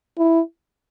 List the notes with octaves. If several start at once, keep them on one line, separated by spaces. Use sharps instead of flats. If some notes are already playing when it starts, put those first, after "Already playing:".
E4